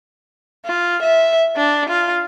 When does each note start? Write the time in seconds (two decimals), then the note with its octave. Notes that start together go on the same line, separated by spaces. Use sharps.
0.65 F4
1.02 E5
1.56 D4
1.89 F4